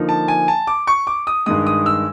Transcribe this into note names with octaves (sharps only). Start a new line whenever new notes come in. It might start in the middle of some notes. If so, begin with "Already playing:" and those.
Already playing: D3 F3 A#3 D#4
A5
G#5
A5
D6
C#6
D6
D#6
G2 D#3 G#3 D#6
D#6
E6